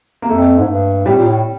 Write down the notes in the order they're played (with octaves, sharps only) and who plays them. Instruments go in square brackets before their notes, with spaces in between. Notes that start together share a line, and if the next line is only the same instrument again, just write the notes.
[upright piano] A#3
[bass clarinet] F2 [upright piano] A3
[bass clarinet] G#2
G2
[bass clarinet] A2 [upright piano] G3
[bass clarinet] A#2
A2